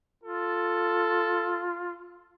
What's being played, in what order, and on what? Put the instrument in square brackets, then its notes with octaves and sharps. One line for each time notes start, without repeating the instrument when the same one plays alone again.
[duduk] F4 [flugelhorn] A4